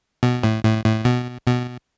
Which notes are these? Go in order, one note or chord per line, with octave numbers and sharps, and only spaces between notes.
B2
A2
A2
A2
B2
B2